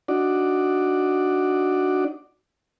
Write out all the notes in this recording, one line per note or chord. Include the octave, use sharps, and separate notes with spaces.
D4 D#4 F#4 D5